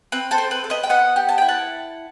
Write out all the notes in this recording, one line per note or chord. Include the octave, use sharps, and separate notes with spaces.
C4 B4
A4 C5
C4
B4
A4
B4 D#5
G5
B3 D#5 F#5
G4
A5
E4 G5
F#5 A5